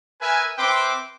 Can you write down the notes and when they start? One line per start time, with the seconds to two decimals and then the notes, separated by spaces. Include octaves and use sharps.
0.22 A#4 B4 E5 G#5
0.58 C4 B4 E5 G5 C6 D6